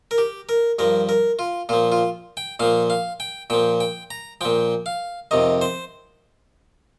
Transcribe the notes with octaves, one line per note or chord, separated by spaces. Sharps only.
A#4
G4
A#4
G2 F3 A#4
A#4
F4
A#2 F3 F4
F4
G5
A#2 F3 F5
F5
G5
A#2 F3 G5
G5
A#5
A#2 F3 G5
F5
F2 C3 D#3 D#5
C5